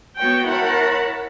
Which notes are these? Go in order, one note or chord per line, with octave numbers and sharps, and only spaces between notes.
B3 F#4 C#5 G5
E4 A#4 C#5 F#5 A5 B5